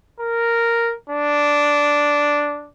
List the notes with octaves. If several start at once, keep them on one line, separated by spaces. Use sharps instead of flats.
A#4
D4